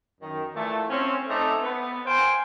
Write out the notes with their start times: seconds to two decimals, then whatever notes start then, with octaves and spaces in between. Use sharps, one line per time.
0.21 F#2 D#3
0.55 A#2 E3 A3
0.90 C4 C#4
1.28 A3 C4 D#4 A4 D5
1.62 B3
2.06 C5 F5 G5 G#5 C6